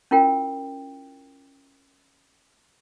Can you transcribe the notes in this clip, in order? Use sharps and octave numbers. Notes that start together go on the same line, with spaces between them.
C#4 E4 F4 A#4 G5